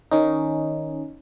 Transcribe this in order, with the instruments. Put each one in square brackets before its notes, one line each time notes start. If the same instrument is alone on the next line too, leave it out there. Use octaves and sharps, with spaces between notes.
[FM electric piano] D#3 C#4 D#4